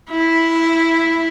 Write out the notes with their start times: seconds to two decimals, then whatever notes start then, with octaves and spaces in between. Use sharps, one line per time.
0.10 E4